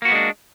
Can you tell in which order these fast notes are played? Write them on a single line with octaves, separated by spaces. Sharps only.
A#3 F#4 B3 G#3 D4